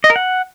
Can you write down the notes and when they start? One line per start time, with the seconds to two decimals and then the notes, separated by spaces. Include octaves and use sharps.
0.04 D#5
0.10 A#4
0.16 F#5